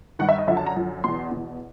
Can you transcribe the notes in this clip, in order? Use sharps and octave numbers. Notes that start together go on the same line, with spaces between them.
G2 D#3 F#5
E5
D#5
F#2 D3 F3 E5
A5
A#5
F#2 D3 F3
E2 B2 C6
E2 B2